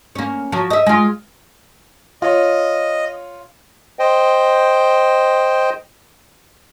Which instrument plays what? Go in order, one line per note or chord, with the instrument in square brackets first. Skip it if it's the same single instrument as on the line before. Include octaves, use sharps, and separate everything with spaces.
[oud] A#3 C#4
F3 F#3
D#5 E5
G#3 F4
[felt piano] F4 C#5 [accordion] D#5
[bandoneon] C5 D#5 G5